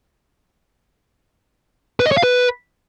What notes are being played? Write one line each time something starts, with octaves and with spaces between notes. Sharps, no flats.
B4
D#5
C#5
F5
B4